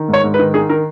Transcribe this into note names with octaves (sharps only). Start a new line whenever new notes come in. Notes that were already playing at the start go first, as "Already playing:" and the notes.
Already playing: D#3
G#2 C#5
G#2
B4
D#3
D#3 G#4
D#3 A#4